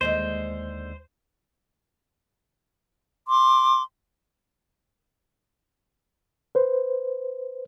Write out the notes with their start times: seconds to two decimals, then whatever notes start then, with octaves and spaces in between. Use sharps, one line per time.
0.01 D#2 D3 G#3 C5 D#5
3.28 C6 D6
6.55 B4 C5